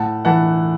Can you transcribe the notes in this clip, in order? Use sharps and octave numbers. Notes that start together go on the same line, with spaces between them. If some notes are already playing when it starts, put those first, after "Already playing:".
Already playing: A2 F#5 A5
E3 F#5 A5